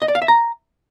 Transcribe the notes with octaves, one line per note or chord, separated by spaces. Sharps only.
D#5
D5
F5
E5
A#5